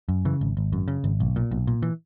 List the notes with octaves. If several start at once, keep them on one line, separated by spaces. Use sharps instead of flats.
F#2
C#3 E3
G#1
G#1
F#2
C#3
G#1
B1
A#2
B1
A#2
E3